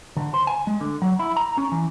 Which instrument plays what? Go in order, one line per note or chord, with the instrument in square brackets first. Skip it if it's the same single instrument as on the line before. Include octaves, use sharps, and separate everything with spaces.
[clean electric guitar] D3
C5
G#5
G#3
D3
F#3
E4
A#5
C#4
E3